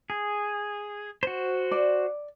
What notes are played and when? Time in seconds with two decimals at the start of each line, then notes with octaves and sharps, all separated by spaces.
0.10 G#4
1.23 F#4 C5
1.71 D5